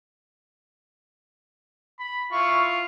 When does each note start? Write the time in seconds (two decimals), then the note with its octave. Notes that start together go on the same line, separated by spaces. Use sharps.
1.99 B5
2.32 E4 F4 C#6